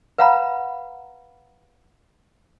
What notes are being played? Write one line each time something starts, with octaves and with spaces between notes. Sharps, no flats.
B4 F5 F#5 A#5 B5